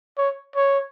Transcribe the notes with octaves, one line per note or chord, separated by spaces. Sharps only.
C#5
C#5